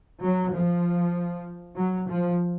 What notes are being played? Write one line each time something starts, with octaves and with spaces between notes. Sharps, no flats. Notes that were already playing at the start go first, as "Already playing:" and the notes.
F#3
F3
F#3
F3